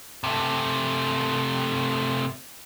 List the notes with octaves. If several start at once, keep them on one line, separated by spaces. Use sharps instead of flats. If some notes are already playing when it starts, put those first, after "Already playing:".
C3 A3